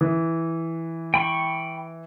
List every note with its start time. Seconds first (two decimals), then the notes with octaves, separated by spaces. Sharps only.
0.01 E3
1.14 G5 B5 C#6